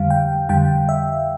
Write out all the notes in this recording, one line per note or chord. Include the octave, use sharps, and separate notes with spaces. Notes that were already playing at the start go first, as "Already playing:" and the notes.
Already playing: F2 D3 G3 F5
G5
F2 D3 G3 G5
E5